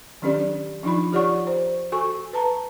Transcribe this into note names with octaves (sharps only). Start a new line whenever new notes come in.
D#3 F#3 C#4 D4 G4 D5
F3 D4 D#4 F4 B5
F4 G4 C#5 D5 F#5 C#6
C5
F#4 A4 G#5 C#6
B4 A5 A#5